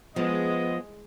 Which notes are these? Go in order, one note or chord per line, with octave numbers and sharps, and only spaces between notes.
F3 G#3 B3 D#5